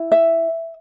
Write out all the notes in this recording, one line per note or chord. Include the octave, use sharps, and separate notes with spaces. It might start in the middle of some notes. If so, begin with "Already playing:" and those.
Already playing: E4
E5